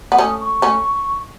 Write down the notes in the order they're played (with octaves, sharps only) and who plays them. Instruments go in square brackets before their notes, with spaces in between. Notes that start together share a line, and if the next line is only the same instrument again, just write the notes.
[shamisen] B3
[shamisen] A3 C#4 [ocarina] D#6
[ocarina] C#6
[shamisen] A3 C#4